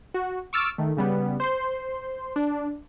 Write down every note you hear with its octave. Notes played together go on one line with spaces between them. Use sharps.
F#4
C#6 D6 E6 F6 A6 D7
D#3 A3
C#3 G3 B3
C5 C6
D4